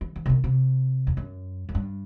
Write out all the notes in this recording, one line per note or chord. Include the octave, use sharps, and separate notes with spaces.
E3
E3
C3
D#3
C3
E2
F#2
F#2
G2